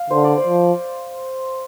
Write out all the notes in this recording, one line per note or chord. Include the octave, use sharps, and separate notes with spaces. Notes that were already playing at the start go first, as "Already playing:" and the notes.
Already playing: F5
D3 C5
D5
C5
F3